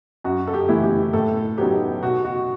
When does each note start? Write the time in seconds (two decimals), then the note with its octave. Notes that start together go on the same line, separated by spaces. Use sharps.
0.24 F#2 F#4
0.47 A4
0.54 G4
0.69 E3 A3 E4
0.84 G4
1.13 A2 A4
1.58 F#3 B3 D#4 G4
2.02 B2 F#4
2.25 F#4